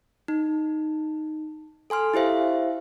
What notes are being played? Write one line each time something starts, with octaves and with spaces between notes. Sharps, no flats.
D#4
A4 G#5 C6 F6
E4 G4 C5 E5 F5